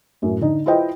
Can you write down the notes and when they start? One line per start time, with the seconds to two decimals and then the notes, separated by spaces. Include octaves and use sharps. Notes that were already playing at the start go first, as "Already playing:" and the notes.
0.22 F#2 A2
0.41 D3 D#4
0.66 E4 F4 B4 C5 D#5 G5